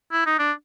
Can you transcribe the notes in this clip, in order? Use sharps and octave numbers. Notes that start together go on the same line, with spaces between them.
E4
D#4
D4